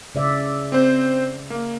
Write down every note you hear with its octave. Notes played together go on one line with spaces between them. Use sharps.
C#3 D5 E5
C4 C5
A#3